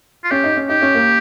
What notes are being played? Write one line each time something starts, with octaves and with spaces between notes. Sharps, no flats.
F4
C#4 G4
D#4
C#4
D#4 G4
C#4
A#3